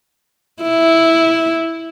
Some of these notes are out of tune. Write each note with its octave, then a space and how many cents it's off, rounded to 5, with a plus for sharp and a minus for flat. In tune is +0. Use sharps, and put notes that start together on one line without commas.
E4 -5